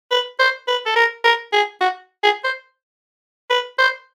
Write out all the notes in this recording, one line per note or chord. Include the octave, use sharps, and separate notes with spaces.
B4
C5
B4
A4
A#4
A#4
G#4
F#4
G#4
C5
B4
C5